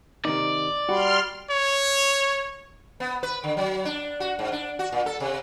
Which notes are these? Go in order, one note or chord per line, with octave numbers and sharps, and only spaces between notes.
C3 D#3 D#4 D5
G3 F#4 C6 F6
C#5
B3
B4
D3
F#3
D4
F#4
G#2
D4
F#4
A#2
A4
C3